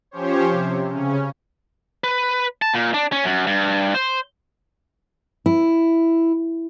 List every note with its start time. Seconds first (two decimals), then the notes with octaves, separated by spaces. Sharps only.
0.11 F3 C#4 G4 C5 C#5
0.50 C3
0.91 C#3 C#4
2.04 B4
2.62 A5
2.74 A#2
2.94 D4
3.12 C#4
3.24 F#2
3.47 G2
3.95 C5
5.46 E4